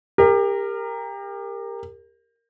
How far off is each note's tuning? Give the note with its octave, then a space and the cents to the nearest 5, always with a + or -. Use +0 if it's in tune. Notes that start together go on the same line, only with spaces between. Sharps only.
G4 +30 A#4 -10